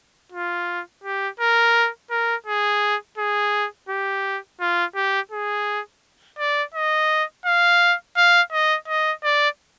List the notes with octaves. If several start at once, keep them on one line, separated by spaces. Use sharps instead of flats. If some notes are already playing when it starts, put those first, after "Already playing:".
F4
G4
A#4
A#4
G#4
G#4
G4
F4
G4
G#4
D5
D#5
F5
F5
D#5
D#5
D5